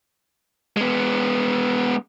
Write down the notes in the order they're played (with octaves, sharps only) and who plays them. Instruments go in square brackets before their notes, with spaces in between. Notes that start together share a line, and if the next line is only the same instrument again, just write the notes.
[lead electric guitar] G#3 B3